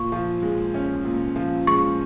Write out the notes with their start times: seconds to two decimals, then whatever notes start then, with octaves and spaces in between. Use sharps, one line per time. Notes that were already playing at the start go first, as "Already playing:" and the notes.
Already playing: A#2 C#6
0.12 F3
0.42 G#3
0.74 C#4
1.05 A#2
1.36 F3
1.67 G#3 C#6